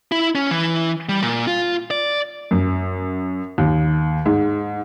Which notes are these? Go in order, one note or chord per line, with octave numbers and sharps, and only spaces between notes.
E4
C#4
E3
G3
A#2
F4
D5
F#2
D#2
G#2